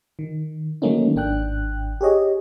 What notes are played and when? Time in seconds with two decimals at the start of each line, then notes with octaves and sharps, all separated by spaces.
0.19 D#3
0.82 D#3 F#3 A3 A#3 C#4 D#4
1.15 G#1 D4 G5 F#6
2.01 G4 G#4 C#5 D#5